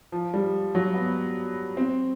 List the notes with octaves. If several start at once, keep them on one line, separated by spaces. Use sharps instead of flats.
F3
G3
F#3
B3
C4